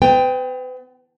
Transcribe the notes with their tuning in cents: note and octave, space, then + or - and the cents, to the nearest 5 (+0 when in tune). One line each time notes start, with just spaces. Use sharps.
B3 +40 G5 +10